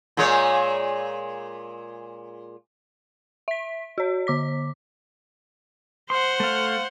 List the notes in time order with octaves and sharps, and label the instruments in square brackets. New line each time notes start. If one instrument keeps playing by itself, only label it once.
[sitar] A#2 G#3 C#5
[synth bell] E5 B6
F#4 C#5
D3 D6 B6
[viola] C5 F#5 [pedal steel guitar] C6
[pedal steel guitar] A3 F5